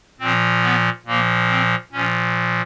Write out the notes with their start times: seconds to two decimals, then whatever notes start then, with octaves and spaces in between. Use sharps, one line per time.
0.20 A#2 F3 C4
0.63 B3
1.06 A#2 F3 A#3
1.49 C4
1.92 A#2 F3 C#4